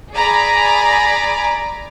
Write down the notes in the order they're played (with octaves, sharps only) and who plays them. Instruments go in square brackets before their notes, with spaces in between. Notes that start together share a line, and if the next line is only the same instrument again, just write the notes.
[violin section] G#4 D5 G#5 A#5 B5